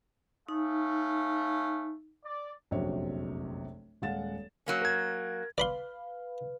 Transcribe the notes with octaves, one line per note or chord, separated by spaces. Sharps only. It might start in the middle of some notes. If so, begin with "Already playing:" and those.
A3 C#4 D#4 F5
D5
F1 A#1 F#2 C3 F#4 C#5
D#1 G#3 F5 F#5 A6 E7
F#3 A#3 C#4
A#4 G#6
B4 D5 F5 B5 C6